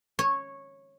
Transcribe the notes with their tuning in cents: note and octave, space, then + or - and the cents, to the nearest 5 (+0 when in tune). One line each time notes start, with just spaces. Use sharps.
C#5 -10